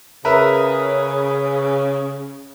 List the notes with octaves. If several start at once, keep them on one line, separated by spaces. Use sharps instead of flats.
C#3 A#4 B4 E5